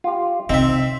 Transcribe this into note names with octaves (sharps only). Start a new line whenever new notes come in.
F4 G4
C3 C4 D#4 E5